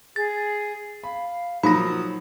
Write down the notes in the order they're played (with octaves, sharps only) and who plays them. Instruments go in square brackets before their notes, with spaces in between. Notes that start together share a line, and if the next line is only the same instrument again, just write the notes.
[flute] G#4 [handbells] A6
[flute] F5 [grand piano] B5
[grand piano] F3 F#3 A#3 [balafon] D#4 [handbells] B5 A#6 [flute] D#6